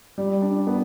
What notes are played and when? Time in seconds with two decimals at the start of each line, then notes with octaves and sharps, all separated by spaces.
0.18 G3
0.42 D4
0.67 B3